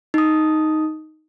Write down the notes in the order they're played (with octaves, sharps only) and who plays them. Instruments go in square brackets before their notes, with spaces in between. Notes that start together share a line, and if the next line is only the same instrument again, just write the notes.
[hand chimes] D#4 D#6